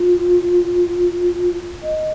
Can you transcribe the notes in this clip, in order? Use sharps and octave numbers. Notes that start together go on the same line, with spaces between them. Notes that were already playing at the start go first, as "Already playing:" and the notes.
Already playing: F4
D#5